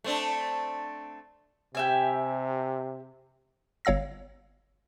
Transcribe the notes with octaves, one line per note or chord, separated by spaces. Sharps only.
A3 C4 D4
C3 G4 E5 G#5
G1 C#5 F5 E6 A#6